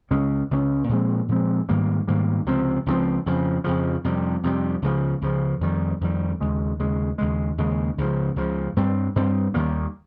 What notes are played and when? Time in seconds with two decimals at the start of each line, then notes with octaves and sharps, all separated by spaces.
0.11 C#2 C#3 G#3 C#4
0.51 C#2 C#3 G#3 C#4
0.89 A#2 F3 G#3 C4
1.28 A#2 F3 G#3 C4
1.69 G#2 D#3 G3 A#3
2.07 G#2 D#3 G3 A#3
2.46 C#2 C3 F3 C4
2.86 C#2 C3 F3 C4
3.26 F2 C#3 F3
3.64 F2 C#3 F3
4.05 F2 C3 G3
4.44 F2 C3 G3
4.82 C#2 C#3 F3
5.22 C#2 C#3 F3
5.61 F2 D#3 G3
6.01 F2 D#3 G3
6.40 D#2 C#3 G#3
6.79 D#2 C#3 G#3
7.18 D#2 C#3 G#3
7.58 D#2 C#3 G#3
7.98 C#2 C#3 F3
8.36 C#2 C#3 F3
8.76 G2 G3 C4
9.16 G2 G3 C4
9.54 D#2 D#3 G3 A#3